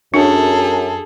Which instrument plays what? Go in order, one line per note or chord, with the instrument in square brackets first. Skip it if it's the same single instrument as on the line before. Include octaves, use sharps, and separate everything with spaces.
[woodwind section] F#2 [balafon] D4 [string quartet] G#4 A4